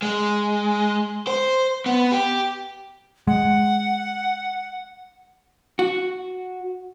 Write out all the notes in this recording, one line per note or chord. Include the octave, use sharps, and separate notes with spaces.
G#3
C5
B3
G4
G#3 F#5
F#4